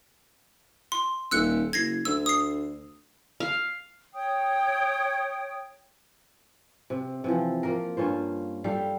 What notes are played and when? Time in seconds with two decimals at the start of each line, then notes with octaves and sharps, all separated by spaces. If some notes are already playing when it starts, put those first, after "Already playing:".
0.92 C6
1.31 D#1 E6 F#6 C#7
1.73 F#1 G#6 A#6 C7
2.05 D2 E6
2.26 D#6 C7
3.40 F5
4.14 C#5 G5 D#6
6.90 C3
7.24 C3 E3 F3
7.63 F3 A#3 A#4
7.97 G2 C#4 F4 C5
8.64 G3 G4 A4 F5